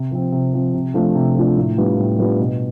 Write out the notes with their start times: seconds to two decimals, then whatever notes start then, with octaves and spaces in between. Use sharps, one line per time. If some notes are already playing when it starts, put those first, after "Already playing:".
Already playing: C3
0.11 F3 C4
0.32 C3
0.53 F3 C4
0.74 C3
0.94 F3 A3 D4 F4
1.15 C3
1.35 F3 A3 D4 F4
1.57 A2
1.77 G3 B3 D4 F4
1.98 A2
2.19 G3 B3 D4 F4
2.40 B2